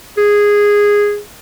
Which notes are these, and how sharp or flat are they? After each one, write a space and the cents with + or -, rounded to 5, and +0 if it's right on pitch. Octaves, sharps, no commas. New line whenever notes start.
G#4 -10